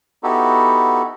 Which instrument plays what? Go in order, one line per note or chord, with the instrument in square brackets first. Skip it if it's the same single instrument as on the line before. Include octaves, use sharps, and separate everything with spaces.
[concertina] B3 D#4 E4 F#4 G4 A4